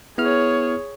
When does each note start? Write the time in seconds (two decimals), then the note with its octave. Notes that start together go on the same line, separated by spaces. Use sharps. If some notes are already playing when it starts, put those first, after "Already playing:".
0.18 B3 E4 G#4 C#5 F6